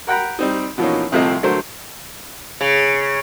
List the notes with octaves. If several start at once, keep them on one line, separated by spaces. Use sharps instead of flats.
A#4 F#5 G5 A#5 B5
G3 C4 D#4
B2 E3 F3 A#3 C#4 D#4
C2 C3 F3 A3 C4 D#5
D3 F#3 A3 A#4 C5
C#3